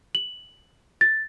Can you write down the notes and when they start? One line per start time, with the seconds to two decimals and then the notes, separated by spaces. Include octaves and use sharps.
0.15 F#7
1.01 A6